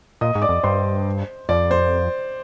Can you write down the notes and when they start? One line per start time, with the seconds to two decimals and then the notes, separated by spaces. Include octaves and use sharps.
0.21 A#2 D#5 D#6
0.35 G#2
0.42 D5 D6
0.49 F2
0.63 G2 C5 C6
1.49 F2 D5
1.71 C5